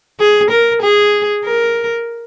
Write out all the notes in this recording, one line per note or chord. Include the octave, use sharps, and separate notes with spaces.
G#4
A#4
G#4
A#4